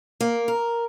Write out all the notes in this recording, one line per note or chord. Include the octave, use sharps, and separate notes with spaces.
A#3
A#4